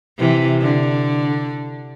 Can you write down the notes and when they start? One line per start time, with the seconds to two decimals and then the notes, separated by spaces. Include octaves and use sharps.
0.19 C3 E3
0.61 D3